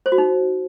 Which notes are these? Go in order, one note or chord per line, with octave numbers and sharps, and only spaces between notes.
C5
F#4
D#4